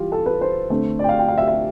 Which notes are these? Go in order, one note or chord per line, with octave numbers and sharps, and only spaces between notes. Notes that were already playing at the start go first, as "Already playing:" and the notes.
Already playing: E3 G3 F4 G4
A4
B4
C5
D3 A3 C4
D5
G5
F5
G5
F5
E5
E5